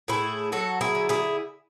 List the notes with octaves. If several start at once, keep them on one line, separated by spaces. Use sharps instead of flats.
A2 E4 G#4
F#3 F#4 A4
E4 G#4
D3
E4 G#4